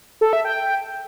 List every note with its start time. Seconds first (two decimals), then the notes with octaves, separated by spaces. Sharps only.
0.21 A4
0.33 E5
0.45 G5